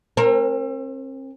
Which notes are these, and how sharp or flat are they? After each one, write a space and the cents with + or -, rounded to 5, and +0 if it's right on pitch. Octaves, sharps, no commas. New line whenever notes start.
C4 +40 A#4 +0